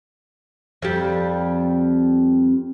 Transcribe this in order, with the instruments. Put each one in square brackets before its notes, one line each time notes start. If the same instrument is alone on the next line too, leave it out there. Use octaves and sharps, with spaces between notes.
[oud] F2 G3